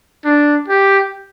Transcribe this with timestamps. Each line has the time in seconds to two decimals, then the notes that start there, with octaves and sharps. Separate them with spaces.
0.25 D4
0.68 G4